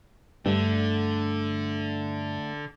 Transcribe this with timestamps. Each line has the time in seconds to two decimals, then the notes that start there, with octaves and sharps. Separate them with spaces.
0.46 G2 D3 A3